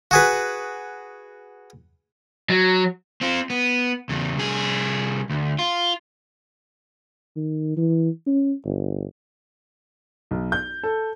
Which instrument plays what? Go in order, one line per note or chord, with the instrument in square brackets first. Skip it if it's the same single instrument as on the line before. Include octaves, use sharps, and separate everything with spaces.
[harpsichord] F#4 G#4 B4
[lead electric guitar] F#3
[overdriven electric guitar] C4 F4
B3
E2 C#3
C2 G#4
D2
F4
[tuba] D#3
E3
C#4
G1
[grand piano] B1
G6
A4